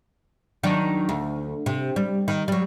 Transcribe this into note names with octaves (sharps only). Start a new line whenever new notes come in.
D#3 F#3 D4
D2
C3
G3
D#3
F#3 G3